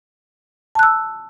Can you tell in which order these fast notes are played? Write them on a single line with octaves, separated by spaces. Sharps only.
A5 F#6 E6